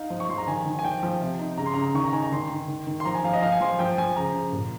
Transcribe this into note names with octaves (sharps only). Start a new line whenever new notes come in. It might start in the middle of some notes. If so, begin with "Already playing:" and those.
Already playing: D#4 F5
F3
C#6
F3 C6
A#5
D#3 G#5
D#3
G#5
F3 G5
F3
C3
D#4
C#3 A#5
C6
C#3 A#5
D#3 C#6
A#5
D#4 G#5
A#5
D#3 C6
D#3
D#3
D#3
C6
F3 A#5
G#5
F3 F5
D#5
F3 F5
G#5
F3 C6
F3 G5
F3 G#5
C#3 A#5
C#3
A#2